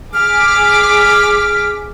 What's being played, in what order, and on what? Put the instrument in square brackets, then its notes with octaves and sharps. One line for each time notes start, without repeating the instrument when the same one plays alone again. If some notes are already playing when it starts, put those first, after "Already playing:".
[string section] G#4 D6 B6 [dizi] F6